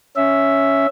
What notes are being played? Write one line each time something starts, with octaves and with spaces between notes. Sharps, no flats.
C#4 E5